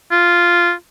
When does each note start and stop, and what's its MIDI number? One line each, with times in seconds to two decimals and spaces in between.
0.12 0.72 65